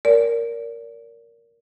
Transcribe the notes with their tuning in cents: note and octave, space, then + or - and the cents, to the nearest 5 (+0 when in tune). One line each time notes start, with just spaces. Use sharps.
A#4 +0 D5 -30